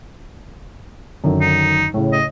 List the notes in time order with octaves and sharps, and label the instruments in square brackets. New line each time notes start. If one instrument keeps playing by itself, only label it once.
[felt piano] F#2 D3 D#3
[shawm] D#4
[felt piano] A2 C#3
[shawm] D#5